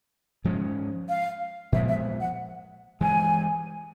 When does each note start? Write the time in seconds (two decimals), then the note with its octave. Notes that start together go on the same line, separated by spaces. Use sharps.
0.44 G#2 F3 G#3 C#4
1.08 F5
1.72 A#2 F3 G#3 B3 E5
1.89 E5
2.20 F#5
3.01 G2 E3 G#3 G#5